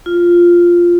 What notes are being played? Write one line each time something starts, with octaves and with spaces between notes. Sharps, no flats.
F4